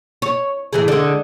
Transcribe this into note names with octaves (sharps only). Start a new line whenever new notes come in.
C#5
A2 E3 G#4
D3 G#3